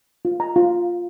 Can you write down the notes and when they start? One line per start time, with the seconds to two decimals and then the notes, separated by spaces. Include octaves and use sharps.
0.25 F4
0.40 A#5
0.56 F4